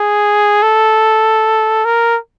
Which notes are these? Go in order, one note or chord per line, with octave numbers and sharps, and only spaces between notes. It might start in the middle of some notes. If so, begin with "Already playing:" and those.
Already playing: G#4
A4
A#4